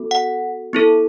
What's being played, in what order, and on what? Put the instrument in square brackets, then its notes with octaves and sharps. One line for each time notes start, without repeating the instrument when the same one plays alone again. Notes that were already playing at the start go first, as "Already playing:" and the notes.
Already playing: [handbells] B3 F#4 A4
F#5
B3 E4 A4